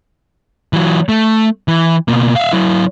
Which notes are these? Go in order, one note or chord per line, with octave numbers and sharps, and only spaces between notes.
E3 F#3
A3
E3
B2 A#3
E5 F5
F#3 E4